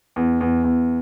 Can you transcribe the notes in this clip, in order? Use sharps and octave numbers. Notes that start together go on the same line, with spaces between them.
E2
E2
E2